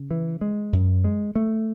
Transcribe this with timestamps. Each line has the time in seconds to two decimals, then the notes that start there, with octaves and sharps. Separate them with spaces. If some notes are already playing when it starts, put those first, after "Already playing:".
Already playing: C#3
0.11 E3
0.41 G#3
0.73 F#2
1.04 G#3
1.35 A3